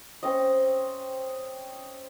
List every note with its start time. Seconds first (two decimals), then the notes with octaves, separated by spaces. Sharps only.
0.23 C4 C#4 D#5